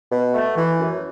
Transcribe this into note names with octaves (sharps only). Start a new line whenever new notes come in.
B2
A3
E3
F#2